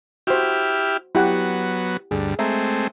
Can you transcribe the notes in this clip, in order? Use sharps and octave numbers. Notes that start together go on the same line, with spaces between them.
E4 F#4 G4 C5 F6
F#3 B3 E4 G4 F#5
D2 G2 G#4
G#3 A3 C4 E5 A#5